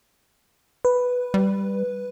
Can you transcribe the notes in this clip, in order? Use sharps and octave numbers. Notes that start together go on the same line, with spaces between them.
B4
G3